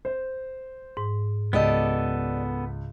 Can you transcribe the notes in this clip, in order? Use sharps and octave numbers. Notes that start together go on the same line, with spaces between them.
C5
G#2
C#2 B3 G4 A4 D5 D#5